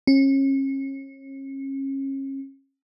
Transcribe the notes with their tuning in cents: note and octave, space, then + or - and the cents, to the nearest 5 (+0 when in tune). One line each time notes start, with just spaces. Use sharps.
C#4 -35